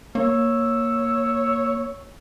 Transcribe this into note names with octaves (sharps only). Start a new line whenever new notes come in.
A#3 C#5 E6